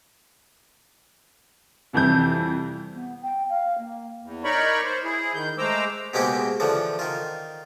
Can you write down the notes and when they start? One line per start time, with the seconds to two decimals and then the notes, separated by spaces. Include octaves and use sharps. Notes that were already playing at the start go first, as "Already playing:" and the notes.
1.93 C2 F2 E3 E4 G6
2.93 B3
3.22 G5
3.49 F5
3.78 A#3
4.23 E2
4.44 D#4 A#4 C#5 D5 B5 C#6
4.84 C5
5.04 E4 G#4
5.34 D#3 G6
5.58 G#3 A3 C5 A#5 D6 E6
6.14 B2 G#3 A#3 C4 G4
6.60 D3 E3 F3
6.99 D#3 F4